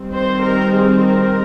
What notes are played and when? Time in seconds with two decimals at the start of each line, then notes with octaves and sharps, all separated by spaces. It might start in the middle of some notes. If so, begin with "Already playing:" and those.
Already playing: D#3 G3 C4
0.13 C5
0.44 A#4
0.74 G#4
1.04 A#4